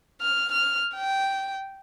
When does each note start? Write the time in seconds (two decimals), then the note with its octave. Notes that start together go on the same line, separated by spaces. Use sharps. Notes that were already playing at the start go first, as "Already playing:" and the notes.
0.22 F6
0.52 F6
0.94 G5